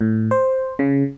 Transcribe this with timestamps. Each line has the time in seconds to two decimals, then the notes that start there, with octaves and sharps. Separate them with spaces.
0.01 A2
0.31 C5
0.79 C#3